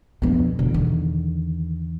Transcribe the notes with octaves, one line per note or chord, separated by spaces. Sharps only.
F2 B2 B3 D4
E2 B2 D3
D#3